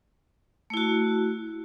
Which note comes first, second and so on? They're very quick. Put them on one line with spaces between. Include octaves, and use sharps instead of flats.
A3 E4 F#4